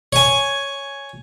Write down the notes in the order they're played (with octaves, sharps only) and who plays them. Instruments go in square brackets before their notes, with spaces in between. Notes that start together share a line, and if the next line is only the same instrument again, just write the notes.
[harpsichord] C#5 G#5